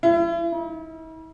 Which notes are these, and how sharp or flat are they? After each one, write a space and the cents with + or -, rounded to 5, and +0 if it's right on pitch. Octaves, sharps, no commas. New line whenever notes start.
E4 +40
E4 -45